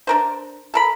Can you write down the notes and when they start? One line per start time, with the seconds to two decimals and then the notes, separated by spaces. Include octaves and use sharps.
0.07 D4 A#4 C5
0.74 A4 A#4 B5